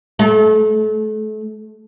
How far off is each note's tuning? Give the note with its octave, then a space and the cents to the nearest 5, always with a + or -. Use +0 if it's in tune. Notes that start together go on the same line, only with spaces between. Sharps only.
A3 -35